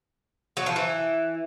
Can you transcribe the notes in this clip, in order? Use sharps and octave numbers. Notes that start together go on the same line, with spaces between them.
F#3
F3
E3